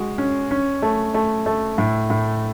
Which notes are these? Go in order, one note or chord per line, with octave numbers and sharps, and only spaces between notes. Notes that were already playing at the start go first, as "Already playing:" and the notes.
Already playing: G#3 F#4
C#4
C#4
A3
A3
A3
A2
A2